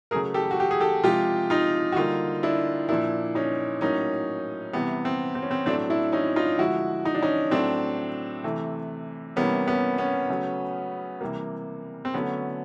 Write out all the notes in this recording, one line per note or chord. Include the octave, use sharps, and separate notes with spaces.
C#3 F#3 A3 G#4 A#4
G4 A4
F#4
G4
G#4
G4 A4
C3 F3 G#3 F4 G4
D#4 F4
F#4
D3 G3 A#3 D#4 F4
D4 E4
A#2 F3 A#3 D4 E4
C#4 D#4
A2 F#3 A#3 C#4 D#4
C3 E3 G3 B3
C4
C4
C#4
C4
A2 F#3 A3 C4 D4
D4 E4
C#4 D#4
D#4 F4
D3 F3 G#3 E4 F#4
D#4
D4
C#4 D#4
A2 F#3 A3 C4 D4
C3 E3 A3
C3 E3 G3 A#3 B3 C#4
B3 C#4
B3 C#4
C#3 F#3 A3
C3 E3 G3 A#3
C4
D3 F#3 A3 B3 C#4